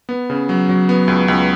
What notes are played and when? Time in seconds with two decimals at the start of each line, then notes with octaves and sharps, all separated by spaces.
0.09 B3
0.30 C#3
0.49 F#3
0.69 F#3
0.89 B3
1.08 C#2
1.28 C#2